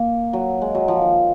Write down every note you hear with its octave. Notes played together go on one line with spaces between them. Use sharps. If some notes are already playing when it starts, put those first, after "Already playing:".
Already playing: A#3
F#3
G#3
F#3
F3
D#3